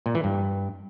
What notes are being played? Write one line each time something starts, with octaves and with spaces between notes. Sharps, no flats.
A#2
E3
G2